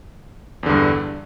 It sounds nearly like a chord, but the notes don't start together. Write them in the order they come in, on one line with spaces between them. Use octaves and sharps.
E2 D3 G2